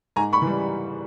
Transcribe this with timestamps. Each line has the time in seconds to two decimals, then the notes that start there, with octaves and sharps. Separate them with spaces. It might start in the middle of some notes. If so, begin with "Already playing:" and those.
0.16 G#2 G#5 A#5
0.33 B5 C#6
0.42 E3 G3